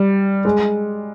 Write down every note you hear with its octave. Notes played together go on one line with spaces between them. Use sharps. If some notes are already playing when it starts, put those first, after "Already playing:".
Already playing: G3
G#3